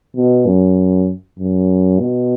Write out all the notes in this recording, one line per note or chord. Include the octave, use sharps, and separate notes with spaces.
B2
F#2
F#2
B2